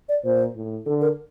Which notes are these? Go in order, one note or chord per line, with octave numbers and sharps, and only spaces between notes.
D5
A#2 C5
A2
D3 A4
A#4